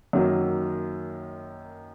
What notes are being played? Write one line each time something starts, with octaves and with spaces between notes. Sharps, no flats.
F#2 D#3 F#3 A#3